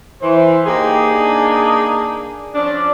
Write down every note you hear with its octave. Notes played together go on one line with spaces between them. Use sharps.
E3 C5
A#3 D#4 G4 G#4
D4
F3 C#4 D4 D5